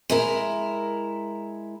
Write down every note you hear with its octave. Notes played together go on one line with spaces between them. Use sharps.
G#3 E4 A#4